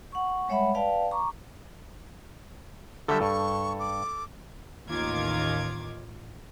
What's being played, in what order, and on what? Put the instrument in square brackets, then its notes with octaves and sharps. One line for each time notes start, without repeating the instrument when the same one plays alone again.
[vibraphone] F#5 C#6
G3 G#3 C#5 E5 F#5 B5
B4 D5 F5 G5 A5
A#5 C#6 D6
[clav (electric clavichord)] D3 F#3 G3 [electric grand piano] A4 [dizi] E5
[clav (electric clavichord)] G2 [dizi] C#6
[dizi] D6
[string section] A1 D#2 D#3 F4 D6 G#6